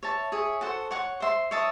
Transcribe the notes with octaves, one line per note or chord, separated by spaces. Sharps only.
C#5 E5 A5
G#4 C#5 E5
F#4 A4 C5 F#5
C#5 F#5 C#6
C5 E5 C6
C#5 E5 A5 D#6